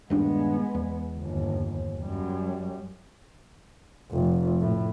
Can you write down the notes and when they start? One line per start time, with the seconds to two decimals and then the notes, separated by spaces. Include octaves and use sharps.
0.10 D#1 G2 G#3 B3 D4
0.75 E2
1.18 G1 D#2
2.02 F#2 G3
4.11 F1
4.60 A2